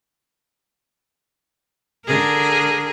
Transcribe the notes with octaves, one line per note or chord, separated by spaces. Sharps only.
D3 G#4 A#4